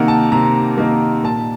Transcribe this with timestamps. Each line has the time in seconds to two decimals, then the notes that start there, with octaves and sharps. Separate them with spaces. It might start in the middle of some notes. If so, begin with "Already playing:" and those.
Already playing: C3 D#3 A#3 F#5 A#5
0.08 A5
0.32 C3 A#5
0.78 D#3 A#3
1.24 A#2 A5